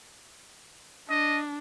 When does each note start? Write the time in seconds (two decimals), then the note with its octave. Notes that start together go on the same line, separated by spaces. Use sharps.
1.09 D4 D#5